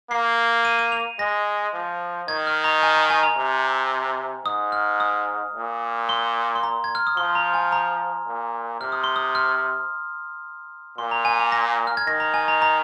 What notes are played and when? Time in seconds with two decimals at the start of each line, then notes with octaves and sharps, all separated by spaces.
0.10 A#3 C7
0.65 D#7
0.79 D#7
0.92 F7
1.19 G#3 A#6
1.73 F3
2.28 D#3 G#6
2.47 F6
2.64 A#5
2.78 A#5
2.83 G#5
2.96 A#5
3.10 G#5
3.23 A#5
3.38 C3
4.45 G#2 D#6
4.72 F6
5.00 D#6
5.55 A#2
6.09 C6
6.55 C6
6.63 A#5
6.84 G#6
6.95 F6
7.07 D#6
7.17 F3 C6
7.35 A#5
7.54 G#5
7.72 A#5
8.27 A#2
8.80 C3 F6
8.92 D#6
9.04 C6
9.16 D#6
9.35 F6
10.98 A#2 C6
11.11 A#5
11.25 G#5
11.39 A#5
11.52 A#6
11.87 F6
11.97 G#6
12.07 D#3 A#6
12.20 A#5
12.34 G#5
12.48 A#5
12.62 A#5